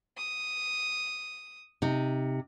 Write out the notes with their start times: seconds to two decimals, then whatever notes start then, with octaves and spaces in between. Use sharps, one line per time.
0.17 D#6
1.82 C3 D#4